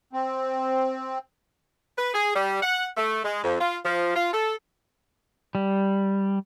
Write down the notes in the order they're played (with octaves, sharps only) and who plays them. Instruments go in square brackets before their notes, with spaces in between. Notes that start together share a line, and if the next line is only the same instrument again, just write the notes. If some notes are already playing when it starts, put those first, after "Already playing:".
[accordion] C4
[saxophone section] B4
G#4
G3
F#5
A3
G#3
F2
F4
F3
F4
A4
[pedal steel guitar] G3